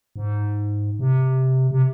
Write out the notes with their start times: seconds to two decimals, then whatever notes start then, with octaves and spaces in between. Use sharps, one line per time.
0.16 G#2
0.99 C3
1.71 C3